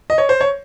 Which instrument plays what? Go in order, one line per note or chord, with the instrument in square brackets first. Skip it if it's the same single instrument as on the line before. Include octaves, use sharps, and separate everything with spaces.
[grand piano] D#5
C#5
C5
C#5